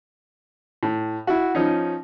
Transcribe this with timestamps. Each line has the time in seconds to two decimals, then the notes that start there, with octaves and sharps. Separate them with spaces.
0.83 A2
1.27 E4 F#4
1.55 F3 C#4 D#4